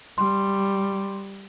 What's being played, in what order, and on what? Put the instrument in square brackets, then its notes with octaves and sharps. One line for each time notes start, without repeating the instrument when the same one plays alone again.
[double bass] G3 [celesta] C6